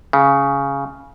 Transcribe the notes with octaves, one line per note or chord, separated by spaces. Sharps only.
C#3